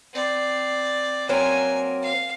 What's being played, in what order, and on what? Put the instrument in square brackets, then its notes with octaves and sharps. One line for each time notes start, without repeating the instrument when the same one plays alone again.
[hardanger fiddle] C4 D5
[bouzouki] F#3 A#3 C4 [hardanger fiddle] G#5
[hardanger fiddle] F5